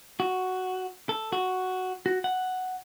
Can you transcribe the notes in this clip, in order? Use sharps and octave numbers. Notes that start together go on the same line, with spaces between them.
F#4
A4
F#4
F#4
F#5